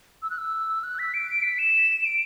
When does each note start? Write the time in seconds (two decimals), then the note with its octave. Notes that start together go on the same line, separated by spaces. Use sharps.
0.22 E6
0.30 F#6
0.38 E6
0.84 F#6
0.99 B6
1.14 D7
1.43 B6
1.59 E7
2.05 D7